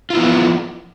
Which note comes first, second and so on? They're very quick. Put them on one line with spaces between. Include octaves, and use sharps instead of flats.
F4 E4 B3 F3